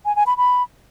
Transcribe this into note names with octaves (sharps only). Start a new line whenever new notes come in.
G#5
G#5
B5
B5